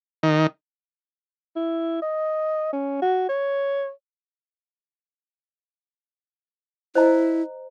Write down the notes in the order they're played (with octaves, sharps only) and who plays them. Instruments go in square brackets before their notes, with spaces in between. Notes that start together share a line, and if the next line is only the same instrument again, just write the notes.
[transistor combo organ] D#3
[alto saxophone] E4
D#5
C#4
F#4
C#5
[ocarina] E4 [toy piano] C5 D#5 A#5